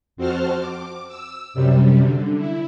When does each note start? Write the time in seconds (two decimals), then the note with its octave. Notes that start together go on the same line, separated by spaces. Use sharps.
0.16 F2 C4 F#4 C5 A5 F6
0.60 D6
1.08 E6
1.54 F#2 C3 G3
2.00 D3
2.37 E4